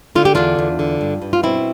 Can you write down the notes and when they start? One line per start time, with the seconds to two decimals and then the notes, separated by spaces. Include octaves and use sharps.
0.15 D3 F4
0.25 G4
0.35 E2 D4 F4
0.59 E2
0.79 D3
1.01 G2
1.22 G2
1.33 F4
1.43 B2 C4 E4